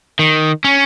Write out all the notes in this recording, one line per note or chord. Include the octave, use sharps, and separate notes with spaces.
D#3
C#4